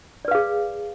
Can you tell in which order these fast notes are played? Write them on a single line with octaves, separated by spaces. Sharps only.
D5 B4 F5 G#4